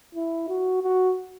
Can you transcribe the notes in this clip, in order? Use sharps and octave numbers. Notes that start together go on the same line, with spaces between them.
E4
F#4
F#4